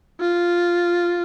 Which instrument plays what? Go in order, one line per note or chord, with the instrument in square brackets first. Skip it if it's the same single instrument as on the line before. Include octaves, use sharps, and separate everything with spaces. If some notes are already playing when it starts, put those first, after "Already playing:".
[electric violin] F4